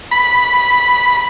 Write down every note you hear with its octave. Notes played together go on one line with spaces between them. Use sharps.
B5